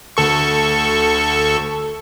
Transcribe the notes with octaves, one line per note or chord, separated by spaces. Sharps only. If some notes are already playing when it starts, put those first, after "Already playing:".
D2 A4 C#6